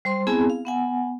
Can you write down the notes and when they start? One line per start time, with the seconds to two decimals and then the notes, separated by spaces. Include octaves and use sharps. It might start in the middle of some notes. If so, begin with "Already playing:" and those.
0.05 G3 C5 C6
0.27 B3 C4 E4 G#4 G#5 A5
0.50 F5
0.65 B3 F#5 G#5